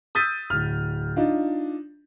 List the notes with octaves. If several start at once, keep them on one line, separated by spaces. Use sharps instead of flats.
D#6 E6 G6 A6 B6 D#7
D1 F6
D4 D#4 F4